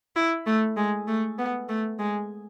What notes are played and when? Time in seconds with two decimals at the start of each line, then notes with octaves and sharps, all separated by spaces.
0.16 E4
0.47 A3
0.77 G#3
1.08 A3
1.38 B3
1.69 A3
1.99 G#3